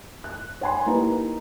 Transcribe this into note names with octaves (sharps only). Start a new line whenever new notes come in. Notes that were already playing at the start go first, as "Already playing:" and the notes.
F#6
C#5 F#5 G#5 B5 C6
A#3 D#4 E4 G4 B4